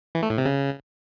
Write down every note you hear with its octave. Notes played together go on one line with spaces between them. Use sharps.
E3
A3
A2
C3
C#3